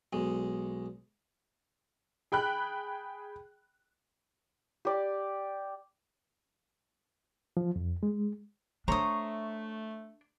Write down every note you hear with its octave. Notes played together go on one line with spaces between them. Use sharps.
B1 G#3
G#4 G5 B5 F#6
G4 D5
F3
F2
G#3
A3 D4 C5 C#5 A#5 D#6